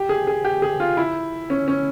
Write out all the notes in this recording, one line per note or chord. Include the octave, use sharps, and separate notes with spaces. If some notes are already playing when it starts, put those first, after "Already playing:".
Already playing: G4
G#4
G#4
G4
G#4
F4
E4
C#4
C#4